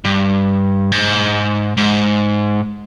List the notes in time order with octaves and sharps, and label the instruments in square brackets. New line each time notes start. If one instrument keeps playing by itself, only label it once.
[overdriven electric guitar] G2
G#2
G#2